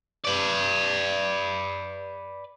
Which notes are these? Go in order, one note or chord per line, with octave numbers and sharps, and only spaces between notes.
B4 D5